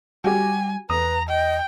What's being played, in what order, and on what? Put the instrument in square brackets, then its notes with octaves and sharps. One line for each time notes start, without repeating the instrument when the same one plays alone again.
[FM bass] G3 [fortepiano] F#4 G4 [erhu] G#5
[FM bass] E2 [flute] B4 [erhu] A#5 [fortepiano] D#6
[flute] D#5 [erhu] G5